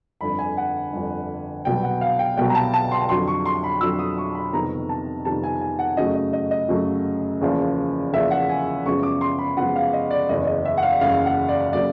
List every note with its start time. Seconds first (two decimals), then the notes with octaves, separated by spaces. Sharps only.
0.21 G1 F2 D3 B5
0.39 G#5
0.57 F#5
0.93 G1 F2 D3
1.65 C2 B2 F#3 B3 G5
1.83 F#5
2.01 F5
2.19 G5
2.37 C2 B2 F#3 B3 G5
2.50 A#5
2.55 A5
2.74 A5
2.91 C6
3.09 F2 D3 F#3 C6
3.28 C#6
3.46 C6
3.64 B5
3.81 F2 D3 F#3 E6
3.99 D#6
4.18 C#6
4.35 B5
4.53 F2 C3 D#3 G3 B3 A#5
4.89 A5
5.25 F2 C3 D#3 G3 B3 A5
5.44 G#5
5.61 G#5
5.79 F#5
5.97 F#2 C#3 F#3 A3 D#5
6.15 D#5
6.33 D#5
6.51 D#5
6.69 F#2 C#3 F#3 A3
7.41 E2 C#3 F3 A#3
8.13 E2 C#3 F3 A#3 E5
8.31 F#5
8.49 G#5
8.85 F#2 C#3 F3 G#3 B3 C#6
9.03 D6
9.21 C6
9.39 B5
9.57 F#2 C#3 F3 G#3 B3 F#5
9.76 F5
9.93 D#5
10.11 D5
10.29 F#1 E2 C#3 D#5
10.47 D#5
10.65 E5
10.77 F#5
10.83 F5
11.01 F#1 E2 C#3 F5
11.26 F#5
11.49 D5
11.73 C#3 F#3 A#3 D5